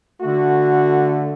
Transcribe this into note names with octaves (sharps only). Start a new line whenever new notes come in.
D3 A3 F#4